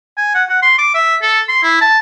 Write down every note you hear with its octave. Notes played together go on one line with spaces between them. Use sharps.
G#5
F#5
F#5
C6
D6
E5
A4
C6
E4
A5